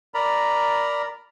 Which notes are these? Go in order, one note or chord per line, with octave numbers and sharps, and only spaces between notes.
A#4 D5 A#5 B5